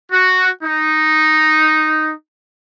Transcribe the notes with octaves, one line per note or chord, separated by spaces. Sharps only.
F#4
D#4